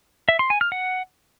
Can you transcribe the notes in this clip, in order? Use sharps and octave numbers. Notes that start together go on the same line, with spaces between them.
E5
C6
G#5
F6
F#5